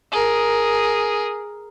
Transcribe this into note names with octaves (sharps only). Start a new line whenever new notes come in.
G#4 A#4